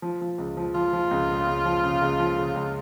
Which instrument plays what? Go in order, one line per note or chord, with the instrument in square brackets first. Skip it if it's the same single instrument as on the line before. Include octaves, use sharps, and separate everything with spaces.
[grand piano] F3
F3
C#2
F3
[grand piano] F3 [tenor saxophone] F4
[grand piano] F3
C#2
C#3
C#2
F3
C#3
C#2
F3
C#3
C#2